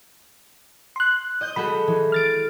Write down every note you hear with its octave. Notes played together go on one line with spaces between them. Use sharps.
C6 F#6
D#5 D#6 G6
G#3 F#4 A4 B5
E3
F6 A6 D7